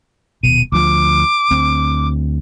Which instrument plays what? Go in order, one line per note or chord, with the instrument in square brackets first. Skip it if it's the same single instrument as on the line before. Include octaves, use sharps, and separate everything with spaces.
[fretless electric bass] D#1 G#1 B2 [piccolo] D#7
[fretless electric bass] D2 F3 [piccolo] D6
[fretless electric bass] D2 C4